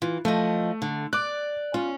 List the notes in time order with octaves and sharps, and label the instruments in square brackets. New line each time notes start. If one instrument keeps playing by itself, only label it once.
[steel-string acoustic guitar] E3 [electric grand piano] F4
[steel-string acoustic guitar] F3 D#5 [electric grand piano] A3
[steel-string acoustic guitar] D3
[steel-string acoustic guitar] D5 [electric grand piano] D6 F#6
[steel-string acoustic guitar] C#4 [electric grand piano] F4